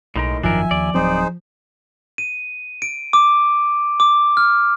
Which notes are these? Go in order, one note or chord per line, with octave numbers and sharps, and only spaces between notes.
B1 A2 G#3 D#4 A#4
G#1 F#2 D#3 F3 D4 A#4 E5 G#5
D#2 D5
D1 F#3 C4 D#4 G#4 C5
D#7
D7
D6
D6
F6